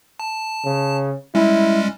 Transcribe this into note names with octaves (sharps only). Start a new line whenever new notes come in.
A5
C#3
G3 G#3 C#4 E4